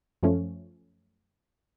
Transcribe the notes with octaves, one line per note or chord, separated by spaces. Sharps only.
F#2 F3 A3 C#4